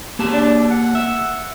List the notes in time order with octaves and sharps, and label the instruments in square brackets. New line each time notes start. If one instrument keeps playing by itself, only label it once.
[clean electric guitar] A#3 G4 A5
[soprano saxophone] D4
F#5
[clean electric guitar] E5